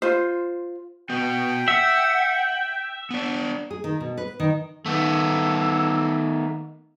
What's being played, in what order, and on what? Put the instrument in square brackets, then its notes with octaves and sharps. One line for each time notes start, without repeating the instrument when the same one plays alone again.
[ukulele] F4 C5
[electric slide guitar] B3 F#4 [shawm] G5
[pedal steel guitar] E5 [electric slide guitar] F#5
[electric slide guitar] B3 D4
[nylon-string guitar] G#4
D#3
B2
B4
D#3
[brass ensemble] D#3 D#4 [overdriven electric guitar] A3 B3 [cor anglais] A4